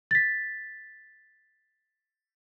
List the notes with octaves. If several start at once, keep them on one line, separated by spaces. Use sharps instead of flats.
A6 B6